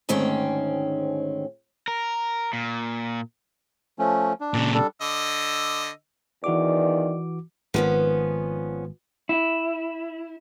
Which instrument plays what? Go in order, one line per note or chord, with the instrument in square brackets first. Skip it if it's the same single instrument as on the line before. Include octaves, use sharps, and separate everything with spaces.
[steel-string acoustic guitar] D2 G#2 D#3 C4 C#4 G5
[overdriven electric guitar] A#4
A#2
[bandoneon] F3 A3 C#4
D4
[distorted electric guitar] A#2 C#3
[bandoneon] G3 D4 A4
[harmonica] D3 D#5 E6
[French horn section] E2 D#3 D5 [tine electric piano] E3 F#4 D6
[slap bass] G#1 D#3 [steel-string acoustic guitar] F3 B3 C#4
[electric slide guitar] E4